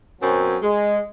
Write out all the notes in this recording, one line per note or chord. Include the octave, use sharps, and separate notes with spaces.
F#2 B2 F#3 C4 C#4 G#5
G#3